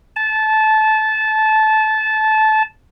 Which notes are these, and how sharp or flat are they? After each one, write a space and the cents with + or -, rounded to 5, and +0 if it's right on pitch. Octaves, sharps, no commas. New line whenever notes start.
A5 -20